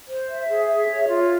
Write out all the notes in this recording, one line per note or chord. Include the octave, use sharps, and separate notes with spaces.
C5
E5
G#4
E5
C#5
F4